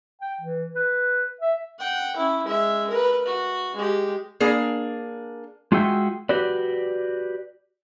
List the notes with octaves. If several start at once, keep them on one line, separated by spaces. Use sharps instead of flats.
G5
E3
B4
E5
F#5 G5
C#4 E4
G#3 E5
A#4 B4
F#4
G#3 G4
A#3 D4 G#4
G#3 F4 F#4 G#4 E5 G5
F#4 G4 B4 D5